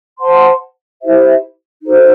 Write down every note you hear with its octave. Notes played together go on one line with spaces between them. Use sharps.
C5 F#5 A5 C6
E4 G4 C5 E5
D#4 F#4 A4 C5